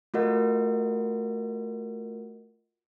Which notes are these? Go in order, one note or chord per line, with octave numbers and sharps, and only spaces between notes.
A3 F4 F#4 A#4 D#5 F#5